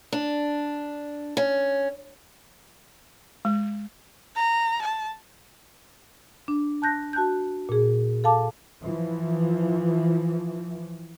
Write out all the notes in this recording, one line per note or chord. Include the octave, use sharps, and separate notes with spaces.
D4
C#4
G#3
A#5
A5
D4
A5 F#6 G6 A#6
F#4 A5 F#6 G6
A#2 G#4
A4 F5 A5 D6
E3 F3